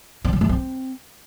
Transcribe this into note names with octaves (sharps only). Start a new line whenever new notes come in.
C4
F#3
A3
C4